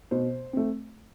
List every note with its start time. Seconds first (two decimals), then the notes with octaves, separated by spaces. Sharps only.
0.11 B2 C5
0.53 A3 C4